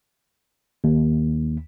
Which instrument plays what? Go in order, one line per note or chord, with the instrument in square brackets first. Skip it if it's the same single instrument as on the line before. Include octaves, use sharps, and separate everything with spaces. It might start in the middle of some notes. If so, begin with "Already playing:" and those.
[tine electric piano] D#2